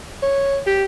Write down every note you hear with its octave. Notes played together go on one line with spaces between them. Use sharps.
C#5
G4